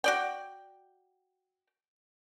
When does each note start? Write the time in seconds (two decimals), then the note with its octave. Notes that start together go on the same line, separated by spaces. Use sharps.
0.04 F#4 D5 G5